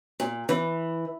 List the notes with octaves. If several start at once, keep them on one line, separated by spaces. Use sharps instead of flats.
A#2
E3